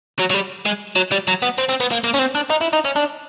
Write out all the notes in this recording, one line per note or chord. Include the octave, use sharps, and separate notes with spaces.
F#3
F#3
G3
G#3
F#3
G3
F#3
B3
C4
C4
B3
A#3
A#3
C#4
C4
D4
D#4
E4
D#4
C#4
D4